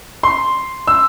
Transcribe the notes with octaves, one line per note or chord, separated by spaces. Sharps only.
C6
E6